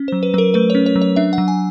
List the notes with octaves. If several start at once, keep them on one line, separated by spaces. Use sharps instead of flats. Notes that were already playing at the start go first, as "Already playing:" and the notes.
Already playing: C#4
C5
F#3
B4
F#3 A#4 B4
A3 B4
C#5
C#4
C#5
F#3
C#5
D4 E5
F#5
F#3
G#5